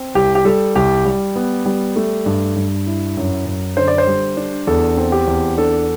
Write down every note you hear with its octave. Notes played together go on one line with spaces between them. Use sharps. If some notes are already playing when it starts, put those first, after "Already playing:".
Already playing: C4
C2 G4
G4
G3 A4
C2 G4
G3
B3
G3
A3
G2
G2
E4
F#2
F#2
D3 C5
D5
C5
G3
D4
E2 A4
C4
G4
E2
D4 A4